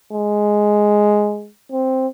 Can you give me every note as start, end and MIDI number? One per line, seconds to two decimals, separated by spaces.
0.13 1.49 56
1.72 2.07 60